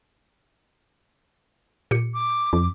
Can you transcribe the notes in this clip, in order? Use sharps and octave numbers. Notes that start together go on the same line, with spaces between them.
A#2 G4 C#7
D6
F2